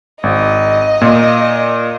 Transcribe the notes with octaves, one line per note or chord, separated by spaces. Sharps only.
G#1 D#5
A#2